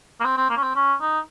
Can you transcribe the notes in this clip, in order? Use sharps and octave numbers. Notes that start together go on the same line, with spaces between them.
A#3
C4
C4
A#3
C#4
C4
C#4
D#4